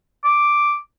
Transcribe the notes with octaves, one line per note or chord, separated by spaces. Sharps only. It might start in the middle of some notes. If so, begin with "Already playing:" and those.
D6